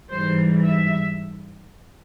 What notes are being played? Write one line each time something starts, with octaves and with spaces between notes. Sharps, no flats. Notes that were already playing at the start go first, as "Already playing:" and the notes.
G#2 E3 G3 C5
E5